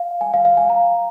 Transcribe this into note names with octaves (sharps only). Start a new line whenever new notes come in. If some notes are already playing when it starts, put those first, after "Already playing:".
Already playing: F5
G#5
F5
F5
G#5
A#5